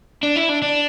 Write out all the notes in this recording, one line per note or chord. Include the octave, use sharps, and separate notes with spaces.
D4
E4
D4
D4